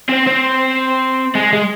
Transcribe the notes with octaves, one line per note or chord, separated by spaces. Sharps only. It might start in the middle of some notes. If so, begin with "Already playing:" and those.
C4
C4
G#3
G#3